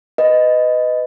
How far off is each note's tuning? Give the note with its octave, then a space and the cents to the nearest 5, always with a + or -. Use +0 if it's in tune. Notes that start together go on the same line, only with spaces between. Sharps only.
B4 +25 D#5 +0